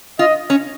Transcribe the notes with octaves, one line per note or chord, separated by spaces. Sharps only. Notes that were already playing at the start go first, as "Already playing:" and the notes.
F4 D#5
C#4